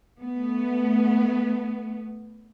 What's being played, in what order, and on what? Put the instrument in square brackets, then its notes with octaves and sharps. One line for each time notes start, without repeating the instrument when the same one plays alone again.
[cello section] A3 B3